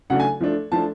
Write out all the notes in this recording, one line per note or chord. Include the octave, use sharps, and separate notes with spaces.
C#3 F#3 A3 D4 F#5
G#5
F3 A3 D4
F3 A3 D4 A5